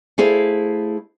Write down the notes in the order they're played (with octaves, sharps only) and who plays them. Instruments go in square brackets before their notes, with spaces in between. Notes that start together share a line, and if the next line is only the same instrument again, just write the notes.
[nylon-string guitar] A3 E4 G#4 C5 F5